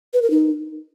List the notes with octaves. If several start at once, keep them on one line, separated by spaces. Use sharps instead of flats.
B4
A#4
D#4